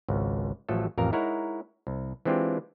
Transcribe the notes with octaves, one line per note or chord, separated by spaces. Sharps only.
G#1 C#2
A1 F3 F#3 A3 A4
A1 F2 A#4 F5
G#3 D#4 E4 A#4 C#5 F#5
C2
E3 G#3 C4 D4 F4 G4